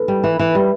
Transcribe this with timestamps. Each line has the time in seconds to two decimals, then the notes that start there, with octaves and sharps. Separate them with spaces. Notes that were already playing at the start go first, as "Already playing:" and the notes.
Already playing: A4 B4
0.08 G3
0.24 E3
0.39 E3
0.55 G3